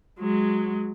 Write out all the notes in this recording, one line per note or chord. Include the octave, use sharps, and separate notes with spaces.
F#3 G#3